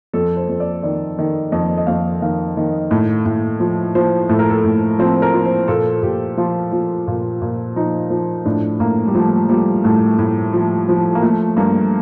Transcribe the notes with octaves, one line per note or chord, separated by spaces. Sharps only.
F2 A4
C5
F2
D5
D#3 D5
D#3
F2 D#5
D#5
F2 F5
D#3 F5
D#3
A2
A2
F3
F3 C5
A2 A4
A#4
A4
A2
F3 C4
A#4
F3
C5
A#2 A4
A#2 G4
F3 F4
F3
A#2
A#2
F3 D#4
F3
A2 D4
A2 A#3
G3
F3 A3
F3 G3
A2 A3
A2
F3
F3
A#3
F3 A3
G2 A#3